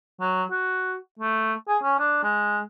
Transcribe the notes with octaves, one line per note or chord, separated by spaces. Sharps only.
F#3
F#4
A3
G#4
C#4
D4
G#3